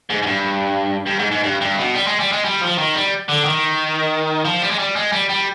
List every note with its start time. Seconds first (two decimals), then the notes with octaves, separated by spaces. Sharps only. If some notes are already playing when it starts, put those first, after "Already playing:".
0.10 G#2
0.22 G#2
0.26 G2
1.06 G2
1.19 G#2
1.31 G#2
1.43 G2
1.61 G2
1.77 B2
1.94 G3
2.07 G#3
2.19 G3
2.32 G#3
2.45 G3
2.61 F3
2.78 D#3
2.94 G3
3.28 D3
3.45 D#3
4.45 F3
4.62 G3
4.71 G#3
4.79 G3
4.96 G#3
5.12 G3
5.29 G3